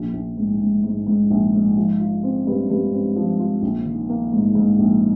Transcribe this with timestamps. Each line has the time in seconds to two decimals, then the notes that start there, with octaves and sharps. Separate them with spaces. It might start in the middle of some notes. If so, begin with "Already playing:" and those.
Already playing: A#1
0.13 A#1
0.37 G#2
0.61 G#2
0.84 G#2
1.07 G#2
1.30 A#1
1.53 G#2
1.77 F3
1.99 F4
2.23 C4
2.47 G2
2.70 G2
2.93 C4
3.16 F3
3.40 F4
3.62 A#1
3.85 D#3
4.09 A#3
4.33 G#2
4.55 G#2
4.79 A#1